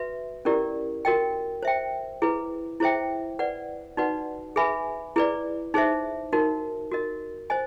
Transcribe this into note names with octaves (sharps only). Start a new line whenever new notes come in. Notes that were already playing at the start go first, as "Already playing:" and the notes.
Already playing: F#4 B4 E5
C#4 E4 G4 A#4 D5
F#4 A#4 D#5 G5
C5 E5 G5
E4 G#4 B4
E4 G#4 C5 E5 G5
B4 D5 F#5
D#4 F#4 B4 D5 F#5
G#4 B4 E5 G#5 B5
E4 G#4 B4 D5
D#4 G#4 C5 E5
D#4 F#4 A#4
F#4 A#4 D#5
C5 D#5 G#5